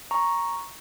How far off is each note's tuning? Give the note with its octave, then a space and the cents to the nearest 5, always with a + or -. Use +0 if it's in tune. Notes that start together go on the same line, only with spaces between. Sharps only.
A#5 +0 C#6 +0